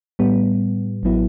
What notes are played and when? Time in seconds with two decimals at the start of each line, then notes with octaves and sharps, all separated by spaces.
0.19 A2 G3 B3
1.03 A1 F#3 B3 E4